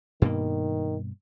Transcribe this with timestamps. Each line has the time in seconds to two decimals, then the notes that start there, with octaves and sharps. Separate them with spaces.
0.22 G2 B2 D#3 A#3